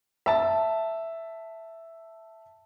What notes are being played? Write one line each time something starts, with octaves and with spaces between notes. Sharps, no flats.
E5 A5